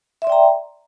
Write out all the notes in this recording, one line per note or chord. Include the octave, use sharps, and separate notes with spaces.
D5 E5 G5 A#5 C6